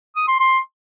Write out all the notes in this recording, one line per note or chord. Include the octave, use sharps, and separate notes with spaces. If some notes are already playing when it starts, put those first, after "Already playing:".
D#6
C6
C6